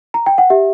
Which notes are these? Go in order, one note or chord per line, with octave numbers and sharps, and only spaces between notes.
A#5
G5
F#5
G4 E5